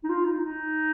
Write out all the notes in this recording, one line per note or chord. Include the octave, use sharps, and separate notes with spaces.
D#4
F4
D#4
D#4